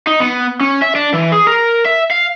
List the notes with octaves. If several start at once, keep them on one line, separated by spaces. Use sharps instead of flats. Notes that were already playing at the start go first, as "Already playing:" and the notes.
D#4
B3
C#4
E5
D4
E3
G#4
A#4
E5
F5